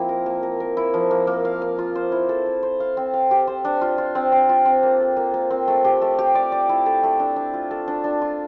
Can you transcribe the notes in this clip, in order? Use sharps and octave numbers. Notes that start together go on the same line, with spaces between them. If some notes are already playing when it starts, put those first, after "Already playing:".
Already playing: F3 A#3 C4 E4
A#4
A#3
A#4
A#4
E4
F3
A#3
A#3
F5
F5
F4
C5
E4
A4
E4
C5
F5
C4
F5
G4
C5
D4
F4
F4
C4
C4
F4
C4
A#3
A4
A#3
A#3
C4
A3
G4
A3
G4
D5
D5
E4
A4
A3
D4
D4
F4
A4
D4
D4
F4